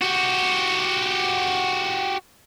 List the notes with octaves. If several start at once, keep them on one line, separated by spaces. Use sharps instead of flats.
F#4 G4